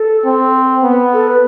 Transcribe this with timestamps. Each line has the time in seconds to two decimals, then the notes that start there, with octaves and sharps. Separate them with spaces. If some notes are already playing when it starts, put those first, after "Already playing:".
Already playing: A4
0.25 C4
0.84 B3
1.12 A4
1.27 B4